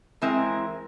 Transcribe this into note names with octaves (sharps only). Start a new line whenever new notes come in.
E3 G#3 C4 E4 A#4